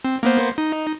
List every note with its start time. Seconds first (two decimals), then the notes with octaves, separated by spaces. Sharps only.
0.05 C4
0.23 A#3 B3 C5
0.58 D#4